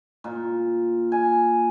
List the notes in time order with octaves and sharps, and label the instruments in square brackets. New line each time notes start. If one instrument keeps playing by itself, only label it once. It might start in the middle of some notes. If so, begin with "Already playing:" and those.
[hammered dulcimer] A#2
G#5